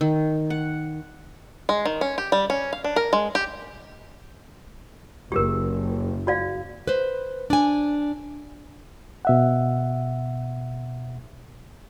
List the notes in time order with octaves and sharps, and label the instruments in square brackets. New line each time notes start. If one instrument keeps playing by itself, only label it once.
[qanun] D#3
F#5
[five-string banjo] G#3
D#3
C#4
G4
G3
C#4
F5
D4
A#4
G#3
G4
[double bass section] F#1 [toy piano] G4 G#4 A#4
[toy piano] F#4 D5 F5
[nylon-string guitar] B4 C5
D4 G#5
[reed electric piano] B2 E5 F#5